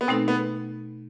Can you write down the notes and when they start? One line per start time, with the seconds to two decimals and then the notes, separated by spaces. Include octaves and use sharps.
0.01 B3
0.08 B2 A3 C4 D#4 A4
0.28 B3